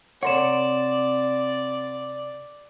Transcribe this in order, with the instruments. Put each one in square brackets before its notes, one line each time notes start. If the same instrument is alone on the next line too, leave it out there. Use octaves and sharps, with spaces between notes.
[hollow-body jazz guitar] C3 A#4 C#5 [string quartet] D5 [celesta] F#5 C6 E7